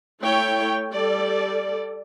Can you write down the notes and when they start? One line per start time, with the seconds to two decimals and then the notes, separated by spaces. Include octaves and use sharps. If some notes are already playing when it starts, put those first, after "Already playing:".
0.20 A3 E4 C#5 G5
0.93 G3 A4 D5